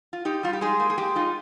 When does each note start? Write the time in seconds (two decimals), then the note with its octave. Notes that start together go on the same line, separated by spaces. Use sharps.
0.13 F4
0.25 D#4 G4
0.43 G3 F4
0.53 G4
0.61 G#3 D#4 G#4
0.80 A#3
0.90 G#4
0.98 G#3 G4
1.15 D#4 F4